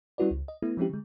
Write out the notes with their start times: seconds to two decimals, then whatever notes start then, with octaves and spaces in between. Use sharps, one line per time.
0.18 G3 C#4 E4 F#4 B4 D5
0.31 C#2
0.48 D#5
0.62 A3 B3 E4
0.77 F3 G#3 C4 C#4 E4 G4
0.90 D3 G#3